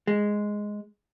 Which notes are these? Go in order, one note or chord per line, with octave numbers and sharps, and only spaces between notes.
G#3